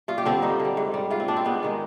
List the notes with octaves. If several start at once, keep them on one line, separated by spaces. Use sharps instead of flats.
G2 F4
G4
D3 G3 C4
G2 D#4
D3
G3
G#2
G3
G#2 F4
C4
G3 D4
C4
G#2 B3
D#3 G#3